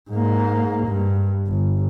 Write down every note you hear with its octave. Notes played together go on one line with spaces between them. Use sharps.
G#2 A#3
G2
G1